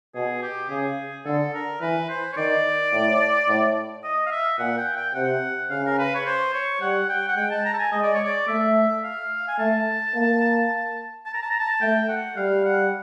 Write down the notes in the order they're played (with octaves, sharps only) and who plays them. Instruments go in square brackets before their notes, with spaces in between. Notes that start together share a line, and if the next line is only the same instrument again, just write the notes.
[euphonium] B2 [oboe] G#4
[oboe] G4
[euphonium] C#3 [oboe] G#4
[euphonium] D3 [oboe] A4
[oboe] A#4
[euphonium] E3 [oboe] B4
[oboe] C5
C#5
[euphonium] D#3 [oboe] D5
[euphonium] A2
A2
[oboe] D#5
F5
E5
[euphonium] A#2 [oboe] F#5
[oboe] G5
G5
[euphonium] C3 [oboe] F#5
[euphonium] C#3 [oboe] F5
[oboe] A#4
B4
C#5
C5
C#5
[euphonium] G3 [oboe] F#5
[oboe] G5
F#5
[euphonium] G#3 [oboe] G5
[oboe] A5
A#5
A5
G#5
[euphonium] G#3 [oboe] D#5
[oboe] D5
C#5
D5
[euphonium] A3 [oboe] E5
[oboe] F5
G#5
[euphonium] A3 [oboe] A5
[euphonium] A#3
[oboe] A5
A#5
A5
A#5
A5
[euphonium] A3 [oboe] G5
[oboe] F#5
[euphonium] G3 [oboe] F5
[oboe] F#5